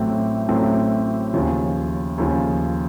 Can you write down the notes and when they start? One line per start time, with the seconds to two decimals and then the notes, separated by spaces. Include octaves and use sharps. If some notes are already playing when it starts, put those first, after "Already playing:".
Already playing: A1 A2 F#3 A3 C4
0.49 A1 A2 F#3 A3 C4
1.34 D#2 C#3 F3
2.18 D#2 C#3 F3